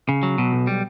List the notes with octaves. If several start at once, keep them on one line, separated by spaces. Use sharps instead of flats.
C#3
F#3
B2
B1
G3